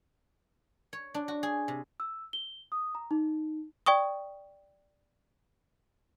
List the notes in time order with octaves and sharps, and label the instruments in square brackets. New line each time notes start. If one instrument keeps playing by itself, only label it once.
[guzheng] C#5
D4
F#4
G#4
C3
[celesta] E6
G7
D#6
A#5
D#4
[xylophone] D5 G5 C#6 D#6